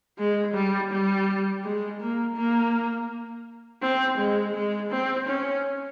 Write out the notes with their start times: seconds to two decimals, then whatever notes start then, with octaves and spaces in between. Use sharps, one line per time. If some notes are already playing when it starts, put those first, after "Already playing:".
0.18 G#3
0.54 G3
0.91 G3
1.63 G#3
2.00 A#3
2.35 A#3
3.82 C4
4.18 G#3
4.54 G#3
4.91 C4
5.27 C#4